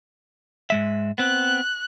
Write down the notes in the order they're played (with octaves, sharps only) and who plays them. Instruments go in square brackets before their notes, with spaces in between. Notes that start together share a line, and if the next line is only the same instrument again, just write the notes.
[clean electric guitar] G#2 G#3 E5
[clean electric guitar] B3 C4 [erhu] F#6